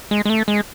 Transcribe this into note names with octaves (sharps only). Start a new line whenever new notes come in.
G#3
G#3
A3
G#3